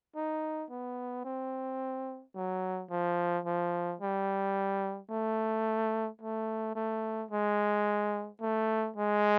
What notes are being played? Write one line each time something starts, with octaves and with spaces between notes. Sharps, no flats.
D#4
B3
C4
F#3
F3
F3
G3
A3
A3
A3
G#3
A3
G#3